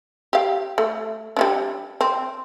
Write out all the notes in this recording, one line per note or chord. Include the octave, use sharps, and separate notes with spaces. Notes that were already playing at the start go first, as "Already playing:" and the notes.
G4 F5
A3
G3 C#4 D4
C4